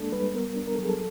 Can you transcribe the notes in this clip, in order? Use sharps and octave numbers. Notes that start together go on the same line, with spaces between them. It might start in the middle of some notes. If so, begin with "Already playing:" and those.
Already playing: G#3 A#3 D4 A4
G3 B4
B3 A#4
D4
A#4
A4
F#3 G#4
A4